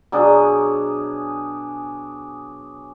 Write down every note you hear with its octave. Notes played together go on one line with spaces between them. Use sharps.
B2 F#3 D4 G#4